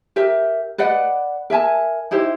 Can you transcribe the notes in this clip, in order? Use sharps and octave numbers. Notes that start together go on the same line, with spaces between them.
G4 A#4 E5
B4 D5 D#5 F#5
A#4 E5 G#5 A5
D#4 E4 G4 C5